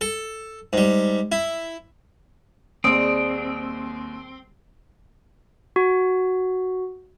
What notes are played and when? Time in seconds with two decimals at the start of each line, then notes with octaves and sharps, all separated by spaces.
0.01 A4
0.73 G#2 G3
1.32 E4
2.84 D#2 G3 G#3 C4 D#6 D7
5.76 F#4